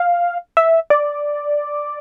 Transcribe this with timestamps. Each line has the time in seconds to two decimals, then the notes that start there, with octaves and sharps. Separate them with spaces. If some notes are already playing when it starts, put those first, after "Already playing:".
Already playing: F5
0.57 E5
0.90 D5